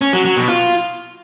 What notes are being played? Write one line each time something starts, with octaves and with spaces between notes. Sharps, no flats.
C#4
F#3
F#3
B2
F4